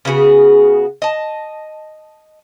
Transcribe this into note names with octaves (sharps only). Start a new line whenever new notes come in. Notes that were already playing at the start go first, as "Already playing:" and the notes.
C#3 B3 F#4 G#4
D#5 A5